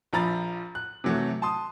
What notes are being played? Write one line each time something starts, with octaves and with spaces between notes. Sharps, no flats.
A#1 F3 A#5 B5 A6
F#6
C3 E3 F#3 A3
A5 C6 D#6